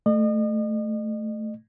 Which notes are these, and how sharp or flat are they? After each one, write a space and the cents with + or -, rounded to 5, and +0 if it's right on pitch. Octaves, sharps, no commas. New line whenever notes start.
A3 -5 D#5 -40